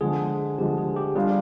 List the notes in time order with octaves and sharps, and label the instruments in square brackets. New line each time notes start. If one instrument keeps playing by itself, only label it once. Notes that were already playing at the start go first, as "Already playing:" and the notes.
[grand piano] D3 F3 G#3 [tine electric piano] G#4
[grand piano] D3 F3 G#3 [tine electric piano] G4
[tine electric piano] G#4
G4
[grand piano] G3 D4 F4 [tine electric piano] G#4